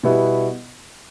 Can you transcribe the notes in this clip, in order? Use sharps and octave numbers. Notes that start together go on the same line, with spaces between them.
B2 G3 B3 E4